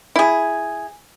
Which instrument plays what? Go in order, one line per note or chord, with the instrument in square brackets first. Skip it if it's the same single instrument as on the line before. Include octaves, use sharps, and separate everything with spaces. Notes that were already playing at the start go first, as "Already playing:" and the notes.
[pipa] E4 G#4